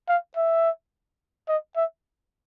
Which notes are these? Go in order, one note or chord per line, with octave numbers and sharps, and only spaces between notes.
F5
E5
D#5
E5